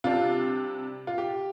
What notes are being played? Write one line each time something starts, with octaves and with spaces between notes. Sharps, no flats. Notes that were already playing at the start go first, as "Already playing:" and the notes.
C3 G3 D4 F4
F4
G4